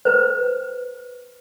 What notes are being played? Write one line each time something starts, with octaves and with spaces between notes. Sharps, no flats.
B4 C5